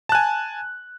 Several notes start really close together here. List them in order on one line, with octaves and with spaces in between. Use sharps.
A5 F#6 G#5